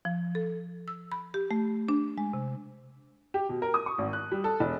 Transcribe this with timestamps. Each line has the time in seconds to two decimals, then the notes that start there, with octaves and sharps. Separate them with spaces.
0.05 F3
0.35 A4
0.88 E6
1.12 B5
1.34 G4
1.51 A3
1.89 D4
2.18 G#3
2.33 C3
3.34 G4
3.49 B2
3.62 A#4
3.74 D#6
3.86 C#6
3.98 G#1
4.13 F#6
4.32 G3
4.44 A4
4.60 E1